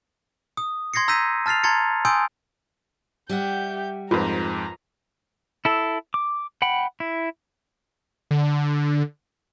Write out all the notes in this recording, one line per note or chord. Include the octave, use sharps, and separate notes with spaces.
D#6
C6 G#6 A#6 C7 C#7
A#5 E6 G6 A#6 B6 D#7
A5 F6 A6 C7 F7
A5 A#5 C6 G#6 A6 C#7
G#5 C6 D#6 E6 G6 D7
G3 G4 E5 F#5 G6
F2 G#2 F4 A#4 B4 A#5
E4 A4
D6
F#5 G5 B5
E4
D3